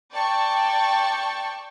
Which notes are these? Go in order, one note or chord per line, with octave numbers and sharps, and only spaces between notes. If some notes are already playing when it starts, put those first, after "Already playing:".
D5 G5 A5 C#6